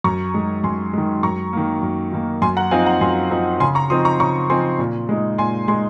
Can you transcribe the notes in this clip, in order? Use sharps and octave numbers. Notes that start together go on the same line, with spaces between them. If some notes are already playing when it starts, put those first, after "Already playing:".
F#2 A#5 C#6
D#3 G#3
F#2 G#5 C6
D#3 G#3
F#2 A#5 C#6
D#3 A#3
F#2
D#3 A#3
F#2 G#5 C6
F#5 A#5
F3 C4 D#4 F5 G#5
F#5 A#5
F#2 G#5 C6
F3 C4 D#4
C#3 G#5 C6
A#5 C#6
F3 C4 D#4 C6 D#6
A#5 C#6
C#3 A#5 C#6
F3 C4 D#4 G#5 C6
A#2
G#3 D#4
A#2 G#5 C6
G#3 D#4 G#5 C6